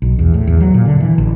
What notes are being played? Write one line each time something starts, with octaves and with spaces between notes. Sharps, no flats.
B1
E2
A2
E2
F#3
A#2
D3
E3
A1